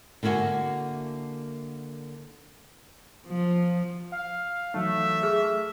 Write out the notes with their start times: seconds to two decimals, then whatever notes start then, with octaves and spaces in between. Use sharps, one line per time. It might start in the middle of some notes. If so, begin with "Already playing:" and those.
0.23 D3 A#3 E4 F#4 G#5
3.28 F3
4.12 F5
4.74 E3 F#3 A3 D#4 E5
5.23 G#4 F6